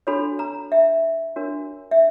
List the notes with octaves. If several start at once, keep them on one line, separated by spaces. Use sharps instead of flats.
D4 F#4 A4 C#5 B5
A#5
E5
D4 F#4 A#4 C#5
E5